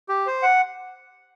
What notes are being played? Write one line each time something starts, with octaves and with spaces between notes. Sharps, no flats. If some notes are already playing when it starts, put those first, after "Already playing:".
G4
C5
F#5